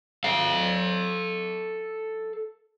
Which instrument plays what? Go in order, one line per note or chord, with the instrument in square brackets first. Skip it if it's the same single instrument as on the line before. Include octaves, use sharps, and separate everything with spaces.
[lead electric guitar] A4 F5